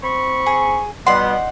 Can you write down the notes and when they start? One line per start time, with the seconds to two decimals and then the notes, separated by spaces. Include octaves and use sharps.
0.03 C4 B5 C#6
0.46 G#4
1.06 B2 G3 B3 D#4 D5 F#5 C6